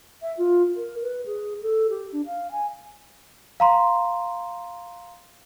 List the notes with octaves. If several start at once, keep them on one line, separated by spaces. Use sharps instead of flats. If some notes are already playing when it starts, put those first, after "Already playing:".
E5
F4
A#4
B4
G#4
A4
G4
D4
F5
G#5
F5 A#5 C6